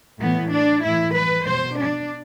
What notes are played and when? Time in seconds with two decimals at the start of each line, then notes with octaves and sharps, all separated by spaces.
0.21 A2 E3 B3
0.53 D4
0.84 A2 E3 E4
1.16 B4
1.47 B2 C5
1.79 D4